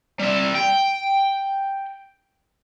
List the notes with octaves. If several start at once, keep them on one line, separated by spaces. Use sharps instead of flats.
G3 E5
G5